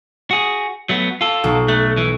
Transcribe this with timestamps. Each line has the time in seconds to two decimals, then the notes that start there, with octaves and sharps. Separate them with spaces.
0.31 F#4 G#4
0.89 F#3 A3 B3
1.21 F4 A4
1.44 B1
1.68 A3 F#6
1.97 E3